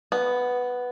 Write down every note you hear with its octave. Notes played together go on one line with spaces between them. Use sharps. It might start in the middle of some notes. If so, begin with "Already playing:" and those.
B3